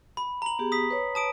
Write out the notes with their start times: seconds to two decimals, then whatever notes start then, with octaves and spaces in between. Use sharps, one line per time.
0.17 B5
0.42 A#5 F#7
0.59 B3 G4 G#4
0.72 D#6 B6
0.91 B4 C#5
1.15 A5 D#6 D7